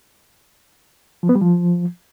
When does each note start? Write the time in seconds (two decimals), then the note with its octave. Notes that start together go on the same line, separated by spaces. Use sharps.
1.23 F3
1.29 B3
1.35 G3
1.42 F3